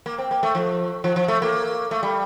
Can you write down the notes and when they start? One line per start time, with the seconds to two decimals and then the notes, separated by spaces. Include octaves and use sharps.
0.06 A#3
0.18 C4
0.31 A#3
0.43 A3
0.55 F3
1.04 F3
1.16 F3
1.28 A3
1.42 A#3
1.91 A3
2.03 G3